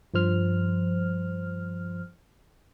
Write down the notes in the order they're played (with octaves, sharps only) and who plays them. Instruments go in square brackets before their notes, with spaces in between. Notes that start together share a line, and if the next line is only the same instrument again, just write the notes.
[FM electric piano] G2 F3 C5 F6